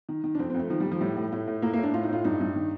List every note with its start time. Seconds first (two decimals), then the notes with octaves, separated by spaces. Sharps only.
0.09 D#3
0.24 D#3
0.35 D4
0.39 F2 C4
0.50 C4
0.54 F2 A3
0.70 D#3 F3
0.80 G3
0.85 D#3
0.91 F3
1.01 A2 G3
1.17 A2
1.32 A2 A3
1.47 A2
1.62 A2 A#3
1.73 A#3
1.78 A2
1.83 D4
1.94 A2 F4
2.03 D#4
2.09 A2 F4
2.24 G2 D#4
2.40 G2
2.56 D#3